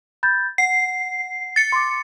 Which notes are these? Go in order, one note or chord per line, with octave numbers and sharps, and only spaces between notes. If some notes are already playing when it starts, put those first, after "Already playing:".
B5 G6 A6
F#5 C7
A6 C#7
C6 D6